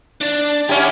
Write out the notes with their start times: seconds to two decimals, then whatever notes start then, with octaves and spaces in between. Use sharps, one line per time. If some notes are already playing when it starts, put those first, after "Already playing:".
0.21 D4 D5
0.69 C#4 E4 G4 F#5